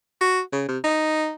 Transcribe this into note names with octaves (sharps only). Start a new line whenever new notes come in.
F#4
C#3
C3
D#4